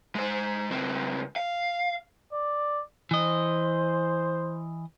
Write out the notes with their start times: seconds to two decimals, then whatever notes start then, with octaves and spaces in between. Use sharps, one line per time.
0.15 G#3 C5
0.70 C#2 C4
1.36 F5
2.33 D5
3.11 E3 C5 D#5